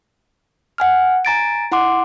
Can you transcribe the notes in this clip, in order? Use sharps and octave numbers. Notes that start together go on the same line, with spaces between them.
F#5 G#5 F6
G#5 A#5 A6 D7
E4 F#5 C6 D6